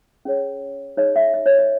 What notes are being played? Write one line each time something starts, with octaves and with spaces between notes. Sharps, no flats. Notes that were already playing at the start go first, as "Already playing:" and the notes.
C#4 G#4 C#5
D#4 G#4 C#5 D#5
E5
D#5
C#5
D#5